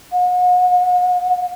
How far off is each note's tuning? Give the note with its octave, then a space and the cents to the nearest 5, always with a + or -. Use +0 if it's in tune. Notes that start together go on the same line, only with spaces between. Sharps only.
F#5 -40